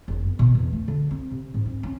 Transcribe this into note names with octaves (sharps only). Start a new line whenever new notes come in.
F#1
B3
B2
E2
A3
D3
C4
C3
G#2
C4
C#4